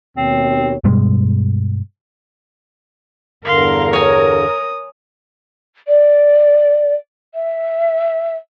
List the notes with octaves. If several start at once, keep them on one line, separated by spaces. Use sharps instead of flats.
D#2 B2 C4 C#5
G2 B2 G3 G#3
E2 G2 D3 A#4 F5 C6
C#5 G#5 D#6
D5
E5